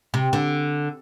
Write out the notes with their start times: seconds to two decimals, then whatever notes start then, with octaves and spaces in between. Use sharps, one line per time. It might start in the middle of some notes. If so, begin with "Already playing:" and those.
0.14 C3
0.33 D3